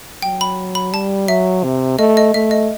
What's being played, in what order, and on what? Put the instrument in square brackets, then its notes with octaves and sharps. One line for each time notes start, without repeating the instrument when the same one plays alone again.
[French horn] F#3 [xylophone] G5
[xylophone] B5
B5
[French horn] G3 [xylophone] A5
[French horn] F#3 [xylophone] E5
[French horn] C3
[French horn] A3 [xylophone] D#5
[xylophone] D#5
[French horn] A3 [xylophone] E5
[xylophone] D#5